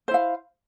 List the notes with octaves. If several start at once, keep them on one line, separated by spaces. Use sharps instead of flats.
E4 C5 F5